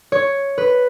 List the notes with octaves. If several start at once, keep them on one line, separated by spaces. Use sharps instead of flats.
C#5
B4